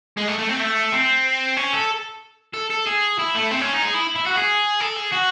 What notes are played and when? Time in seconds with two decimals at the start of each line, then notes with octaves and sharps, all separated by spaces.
0.17 G#3
0.28 A3
0.39 A3
0.49 C4
0.60 A3
0.92 C4
1.57 C#4
1.73 A4
2.53 A4
2.70 A4
2.86 G#4
3.19 E4
3.35 A3
3.51 C4
3.61 C#4
3.72 D#4
3.83 G#4
3.94 E4
4.16 E4
4.26 F#4
4.37 G#4
4.80 A4
4.96 G#4
5.12 F#4